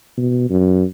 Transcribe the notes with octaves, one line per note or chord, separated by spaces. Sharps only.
B2
F#2